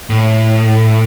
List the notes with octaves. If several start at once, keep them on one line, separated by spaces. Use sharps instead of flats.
A2